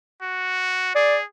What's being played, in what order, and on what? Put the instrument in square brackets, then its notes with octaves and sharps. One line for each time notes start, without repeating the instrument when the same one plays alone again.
[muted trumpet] F#4
[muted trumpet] G#4 [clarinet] D5